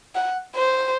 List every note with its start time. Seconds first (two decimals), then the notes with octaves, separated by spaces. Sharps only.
0.15 F#5
0.55 C5